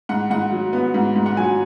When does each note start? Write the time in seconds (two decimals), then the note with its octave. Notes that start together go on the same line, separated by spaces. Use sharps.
0.09 G#2 F#5
0.30 G#2 F#5
0.52 F#3
0.73 B3
0.94 G#2
1.16 G#2
1.26 F#5
1.37 F#3 G#5